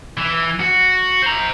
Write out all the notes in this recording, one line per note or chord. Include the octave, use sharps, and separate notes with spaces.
E3
F#4
C5 A#5